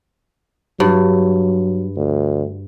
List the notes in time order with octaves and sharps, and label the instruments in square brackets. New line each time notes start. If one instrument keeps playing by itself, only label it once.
[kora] G2 [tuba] F#3
[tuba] D2